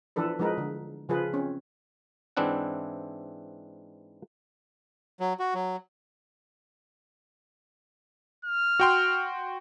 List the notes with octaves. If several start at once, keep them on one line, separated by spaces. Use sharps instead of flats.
E3 F3 D4 A4 B4
F3 G#3 D#4 A#4 B4
D3
C#3 F3 F4 G#4 B4
C4 C#4
G#2 E3 C4 D4 E4 F#5
F#3
F#4
F#3
F6
F#4 G5 C6